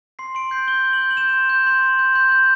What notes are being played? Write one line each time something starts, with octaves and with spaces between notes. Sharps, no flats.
C6 C7
C6 D7
G6 C7
G6 G7
G6
F#7
G6
F#7
G6 E7
C6
G6
C6
C6
G6
C6 G6
G6